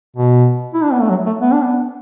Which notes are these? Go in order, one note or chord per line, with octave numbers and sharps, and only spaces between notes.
B2
E4
D4
B3
A3
F#3
A3
B3
D4
B3